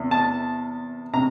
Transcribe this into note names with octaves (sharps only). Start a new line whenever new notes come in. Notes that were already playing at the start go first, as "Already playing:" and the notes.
Already playing: E2 C3
A5
C3 A#5